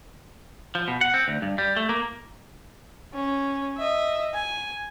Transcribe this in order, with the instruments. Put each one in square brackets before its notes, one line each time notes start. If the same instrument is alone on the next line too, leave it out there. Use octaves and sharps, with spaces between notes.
[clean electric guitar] F3
B2
F#5
C4
D2
G2
G3
A3
A#3
[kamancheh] C#4
D#5 E5
G#5